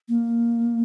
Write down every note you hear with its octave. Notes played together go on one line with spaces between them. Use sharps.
A#3